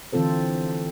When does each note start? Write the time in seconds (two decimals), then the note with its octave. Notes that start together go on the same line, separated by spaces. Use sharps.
0.13 D3 E3 C4 F4 A4 C5